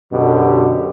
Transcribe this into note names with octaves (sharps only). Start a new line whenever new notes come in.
F#2 B2 D3 G4